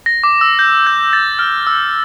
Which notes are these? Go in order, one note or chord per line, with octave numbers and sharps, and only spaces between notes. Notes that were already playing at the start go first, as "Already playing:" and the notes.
A#6
D6
E6
G6
G6
A6
F6
E6